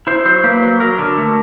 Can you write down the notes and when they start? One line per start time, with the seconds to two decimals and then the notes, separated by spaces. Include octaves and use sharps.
0.07 E4 C5
0.25 F#3 C5
0.44 A#3 B4
0.62 F#3
0.80 F#3 A#4
0.99 D3
1.18 A3